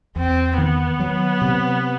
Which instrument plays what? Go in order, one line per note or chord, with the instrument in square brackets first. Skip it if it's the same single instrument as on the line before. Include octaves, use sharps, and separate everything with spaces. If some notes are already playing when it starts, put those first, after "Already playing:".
[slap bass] E2 [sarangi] C4
[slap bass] D#3 [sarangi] B3
[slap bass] F#3
C3